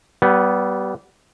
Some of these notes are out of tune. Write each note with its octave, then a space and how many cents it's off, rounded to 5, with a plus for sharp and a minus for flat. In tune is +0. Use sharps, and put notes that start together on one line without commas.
G3 -25 B3 +0